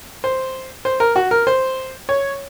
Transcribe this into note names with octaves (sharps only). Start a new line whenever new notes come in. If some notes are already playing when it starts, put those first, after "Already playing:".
C5
C5
A#4
F#4
A#4
C5
C#5